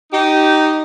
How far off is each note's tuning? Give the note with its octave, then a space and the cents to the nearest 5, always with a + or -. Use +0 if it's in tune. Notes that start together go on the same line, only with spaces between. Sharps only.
D#4 +0 G4 -25